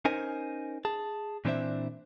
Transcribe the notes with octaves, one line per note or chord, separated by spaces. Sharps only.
C#4 D#4 A#4 C5 D#5 G#5
G#4 A5
A#2 E3 C4 D4 C5 E5